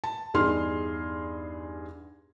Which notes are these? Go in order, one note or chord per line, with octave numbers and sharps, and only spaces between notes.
A5
E2 G2 D#4 G#4 C6 F6